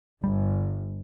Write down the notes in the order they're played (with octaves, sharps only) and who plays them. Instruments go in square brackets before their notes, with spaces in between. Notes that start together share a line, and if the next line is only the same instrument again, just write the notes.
[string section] G1 [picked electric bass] G3